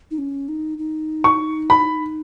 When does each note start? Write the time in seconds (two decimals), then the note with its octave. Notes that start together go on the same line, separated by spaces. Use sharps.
0.11 D#4
0.18 C#4
0.49 D#4
0.78 D#4
1.24 C#6
1.70 B5